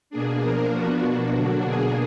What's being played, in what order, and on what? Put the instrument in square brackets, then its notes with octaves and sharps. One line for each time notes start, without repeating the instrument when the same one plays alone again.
[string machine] B2 A#3 D4 G#4
F3 A#3 D4 A#4
F3 B3 D4 F#4
B2 A#3 D4
D3 F#3 D4
B2 A#3 D4 G#4